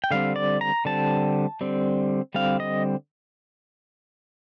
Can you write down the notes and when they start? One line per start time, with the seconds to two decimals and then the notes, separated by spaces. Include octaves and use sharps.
0.04 G5
0.11 D3 G3 C4 F5
0.36 D5
0.61 A#5
0.85 D3 G3 C4 A5
1.61 D3 G3 C4
2.34 D3 G3 C4 F5
2.60 D#5